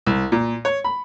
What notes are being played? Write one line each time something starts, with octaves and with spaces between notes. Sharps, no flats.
C2
A#2
C#5
B5